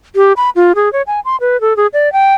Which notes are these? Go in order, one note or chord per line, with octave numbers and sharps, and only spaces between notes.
G4
B5
F4
G#4
C#5
G#5
C6
B4
A4
G#4
D5
G5